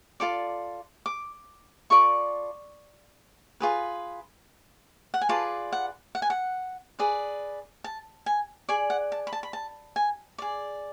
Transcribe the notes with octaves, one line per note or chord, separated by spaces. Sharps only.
F4 A4 D5 D6
D6
F4 A4 D5 C#6
F4 G#4 B4
F#5
G#5
F4 G#4 B4 D5 A5
F#5
F#5
G#5
F#5
G#4 B4 D5
A5
G#5
G#4 D5 G#5
F#5
A5
B5
A5
B5
A5
G#5
G#4 D5